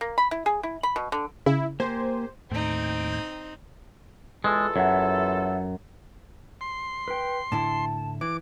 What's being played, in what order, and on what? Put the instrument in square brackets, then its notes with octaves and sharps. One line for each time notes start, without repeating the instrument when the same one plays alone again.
[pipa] A#3
B5
E4
G#4
E4
B5
B2
D3
[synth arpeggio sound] C#3 [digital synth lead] E4
[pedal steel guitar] A#3 G4 G#5 [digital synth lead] C5
[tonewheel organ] D#2 G5 [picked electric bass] A2 [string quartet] C4 D#4
[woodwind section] E2 F4 A4 [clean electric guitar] G#3
[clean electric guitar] F#2 [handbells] C#5 E5 F#5
[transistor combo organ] C6
[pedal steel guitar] B4 G5
[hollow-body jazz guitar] A2 D3 E4 [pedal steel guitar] A5
[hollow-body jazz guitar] E3 [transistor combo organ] D6